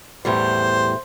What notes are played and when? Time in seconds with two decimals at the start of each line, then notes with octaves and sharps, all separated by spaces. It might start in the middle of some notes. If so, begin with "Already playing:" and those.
0.25 E2 A2 G3 C5